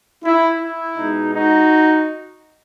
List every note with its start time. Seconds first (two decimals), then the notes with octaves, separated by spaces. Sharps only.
0.24 E4
0.60 E4
0.96 B2 G#3 D#4
1.32 D#4 F#4